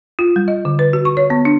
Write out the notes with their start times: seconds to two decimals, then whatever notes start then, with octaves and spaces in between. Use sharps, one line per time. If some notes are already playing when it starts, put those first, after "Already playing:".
0.19 F4
0.36 G3
0.48 D#5
0.65 D3
0.79 B4
0.93 F#4
1.05 C#6
1.17 C#5
1.30 B3
1.45 D4